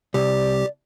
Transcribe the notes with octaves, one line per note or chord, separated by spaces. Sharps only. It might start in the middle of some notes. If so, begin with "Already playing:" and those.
C2 G4 D5